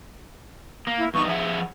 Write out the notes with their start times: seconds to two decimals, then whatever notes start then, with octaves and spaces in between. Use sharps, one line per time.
0.87 A#3
0.98 E4
1.14 E2 G2 D#4 C#6
1.27 F3 G#4 E5 F#5